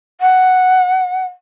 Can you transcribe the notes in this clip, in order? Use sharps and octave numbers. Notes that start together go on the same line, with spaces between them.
F#5